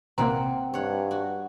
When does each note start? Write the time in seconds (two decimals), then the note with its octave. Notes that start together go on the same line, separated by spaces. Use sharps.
0.18 A#1 C3 A#3 C4 F#5 A#5
0.74 G2 C#5 F#5
1.11 F#4